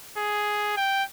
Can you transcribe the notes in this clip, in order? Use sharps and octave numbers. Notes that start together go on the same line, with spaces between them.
G#4
G5